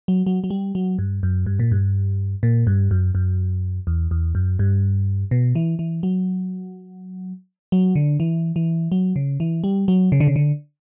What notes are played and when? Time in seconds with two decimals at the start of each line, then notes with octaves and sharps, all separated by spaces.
0.08 F#3
0.26 F#3
0.44 F#3
0.50 G3
0.75 F#3
0.99 G2
1.23 F#2
1.46 G2
1.59 A#2
1.71 G2
2.43 A#2
2.67 G2
2.91 F#2
3.15 F#2
3.87 E2
4.11 E2
4.35 F#2
4.59 G2
5.31 B2
5.55 E3
5.79 E3
6.03 F#3
7.72 F#3
7.95 D3
8.20 E3
8.56 E3
8.92 F#3
9.16 C#3
9.40 E3
9.64 G3
9.88 F#3
10.12 C#3
10.20 D3
10.27 C#3
10.36 D3